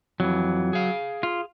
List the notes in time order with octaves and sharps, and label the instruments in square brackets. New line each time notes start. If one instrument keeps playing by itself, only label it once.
[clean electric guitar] F2 E3 [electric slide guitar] F#3
[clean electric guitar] G#4 F5
[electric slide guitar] F4